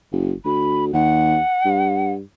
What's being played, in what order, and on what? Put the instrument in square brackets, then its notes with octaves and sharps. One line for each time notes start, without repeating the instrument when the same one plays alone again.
[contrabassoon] F#1
[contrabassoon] D2 [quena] B5
[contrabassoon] D#2 [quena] F#5
[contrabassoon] G2